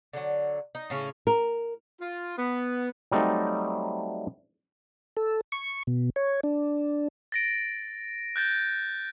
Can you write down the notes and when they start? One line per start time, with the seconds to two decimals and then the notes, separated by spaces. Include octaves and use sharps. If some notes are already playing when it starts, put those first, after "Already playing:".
0.13 D3 F#3
0.75 D#4
0.90 A2 C#3 C#4
1.27 A#4
2.01 F4
2.38 B3
3.11 F#3 G3 A3 C4 D#4
5.17 A4
5.52 C#6
5.87 B2
6.16 C#5
6.43 D4
7.32 A6 A#6 D7
8.36 F#6 G6 A6